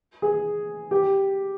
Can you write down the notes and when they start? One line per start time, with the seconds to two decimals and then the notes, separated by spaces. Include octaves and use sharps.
0.22 G#4
0.91 G4